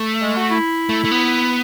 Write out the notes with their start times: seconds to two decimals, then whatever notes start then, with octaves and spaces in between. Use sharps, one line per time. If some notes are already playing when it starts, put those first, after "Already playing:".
Already playing: A3
0.21 G#3
0.36 F#4
0.51 E4
0.89 A3
1.05 A3
1.12 B3